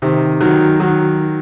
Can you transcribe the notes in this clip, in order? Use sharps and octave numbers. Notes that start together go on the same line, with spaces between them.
C3 D#3
D#3 F#3
D#3 F#3